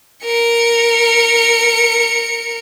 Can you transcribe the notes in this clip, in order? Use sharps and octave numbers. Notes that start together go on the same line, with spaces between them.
A#4 C#7